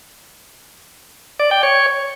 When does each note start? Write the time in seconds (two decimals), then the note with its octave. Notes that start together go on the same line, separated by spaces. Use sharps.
1.40 D5
1.51 G5
1.63 C#5